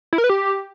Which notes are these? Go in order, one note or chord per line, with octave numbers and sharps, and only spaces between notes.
E4
A#4
B4
G4